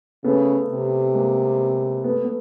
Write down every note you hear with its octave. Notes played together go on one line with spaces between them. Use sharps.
C#3 A3 B3
C3
G#3 A#3
A3 B3
B3